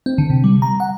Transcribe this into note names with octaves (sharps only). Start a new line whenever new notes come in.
C4
D3
C3
G3
A#5
F#5